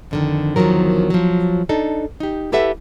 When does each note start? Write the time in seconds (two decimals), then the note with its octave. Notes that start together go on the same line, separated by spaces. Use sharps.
0.11 F2 D3 D#3
0.56 E2 D#3 F3 F#3 A#4
1.10 F3 F#3
1.69 D4 D#4 A4
2.20 D#4 G4
2.52 E4 G4 A4 B4 E5 F#5